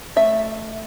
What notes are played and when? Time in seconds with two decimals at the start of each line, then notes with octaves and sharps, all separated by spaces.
0.16 A3 E5